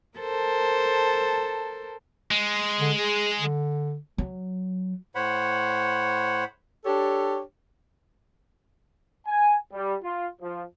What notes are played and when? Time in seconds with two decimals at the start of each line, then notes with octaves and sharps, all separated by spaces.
0.18 A4 A#4 C5 A5
2.31 G#3
2.81 D3
2.98 G#4
3.40 D3
4.18 F#3
5.15 A2 C5 C#5 F#5 B5
6.85 D4 G4 A4 C#5
9.27 G#5
9.72 G3
10.02 F4
10.41 F3